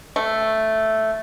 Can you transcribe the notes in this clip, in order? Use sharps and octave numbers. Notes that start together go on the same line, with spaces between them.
A3